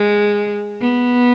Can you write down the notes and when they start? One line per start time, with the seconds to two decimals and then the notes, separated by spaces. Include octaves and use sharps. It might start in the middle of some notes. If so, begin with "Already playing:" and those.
Already playing: G#3
0.81 B3